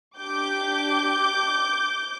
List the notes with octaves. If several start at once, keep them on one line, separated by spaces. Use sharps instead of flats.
D4 G4 D6 G6